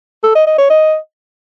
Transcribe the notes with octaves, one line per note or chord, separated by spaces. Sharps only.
A4
D#5
D#5
C#5
D#5